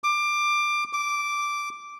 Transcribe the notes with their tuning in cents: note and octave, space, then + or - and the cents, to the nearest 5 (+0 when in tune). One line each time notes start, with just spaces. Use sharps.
D6 +20
D6 -5